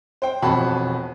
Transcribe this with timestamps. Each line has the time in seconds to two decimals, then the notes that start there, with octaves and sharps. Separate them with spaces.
0.22 C5 G5
0.42 E1 F2 F#4 A5 B5